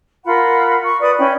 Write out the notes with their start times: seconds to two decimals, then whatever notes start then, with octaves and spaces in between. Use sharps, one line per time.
0.24 F4 A#4 F#5 B5
0.81 C#6
0.99 B4 D5 B5 D#6
1.17 C#4 E4 G5 B5